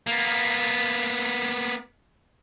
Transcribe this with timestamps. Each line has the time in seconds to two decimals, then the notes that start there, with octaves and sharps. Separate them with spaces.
0.07 A#3 B3